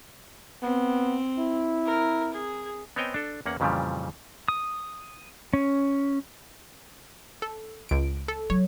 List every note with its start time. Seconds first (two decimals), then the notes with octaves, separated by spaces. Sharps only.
0.63 B3 C4
1.38 E4
1.86 A#4
2.33 G#4
2.96 B3 C4 C#5 D#5 G5 G#5
3.14 D4 A4
3.46 E2 A#3 C#4 F#5
3.60 F2 A#2 C#3 E3 F3 G3
4.48 D#6
5.54 C#4
7.42 A4
7.89 C#2 D7
8.28 A4
8.50 F#3 C#5